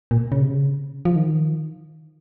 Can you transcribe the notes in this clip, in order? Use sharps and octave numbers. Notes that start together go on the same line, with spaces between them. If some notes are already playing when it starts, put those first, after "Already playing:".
A#2
C#3
C3
C#3
F3
D#3